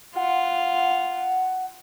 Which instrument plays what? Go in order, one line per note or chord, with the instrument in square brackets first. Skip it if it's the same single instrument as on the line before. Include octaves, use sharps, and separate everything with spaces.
[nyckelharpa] F4 [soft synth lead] F#5